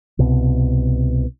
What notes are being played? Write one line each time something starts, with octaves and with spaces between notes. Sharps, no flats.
C2 B2